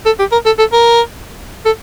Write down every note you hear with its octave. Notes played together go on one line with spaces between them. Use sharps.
A4
G4
A#4
A4
A4
A#4
A4